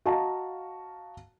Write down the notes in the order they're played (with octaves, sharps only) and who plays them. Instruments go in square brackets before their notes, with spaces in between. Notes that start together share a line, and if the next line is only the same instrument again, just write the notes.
[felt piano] F#4 D#5 F5 A5 A#5